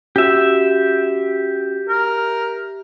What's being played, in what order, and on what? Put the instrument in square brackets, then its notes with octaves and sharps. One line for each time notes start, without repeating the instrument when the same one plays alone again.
[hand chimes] C#4 F#4 [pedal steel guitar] G4 E5
[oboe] A#4